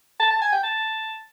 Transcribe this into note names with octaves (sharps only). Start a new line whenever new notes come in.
A5
A5
G#5
G5
A5